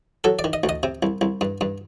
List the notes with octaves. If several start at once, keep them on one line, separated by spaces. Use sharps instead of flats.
F#3 A4
D5
D#3
D#5
D2
D#5
C3
C2
C2
G2
G2